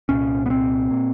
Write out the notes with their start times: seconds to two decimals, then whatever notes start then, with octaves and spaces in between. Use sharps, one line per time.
0.09 C2 A#2 C#4
0.46 B3
0.50 C4
0.91 A#2